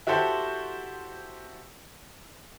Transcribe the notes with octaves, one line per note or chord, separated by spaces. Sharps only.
E4 F#4 G4 A4 C5